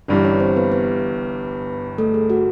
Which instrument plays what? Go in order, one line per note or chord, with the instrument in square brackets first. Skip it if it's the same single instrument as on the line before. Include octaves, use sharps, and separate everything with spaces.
[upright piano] G1 G2 E3 G3 [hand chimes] D4 D5
[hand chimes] C#4 C#5
C4 C5
B3 B4
B3 B4
A3 A4
G#4
F#4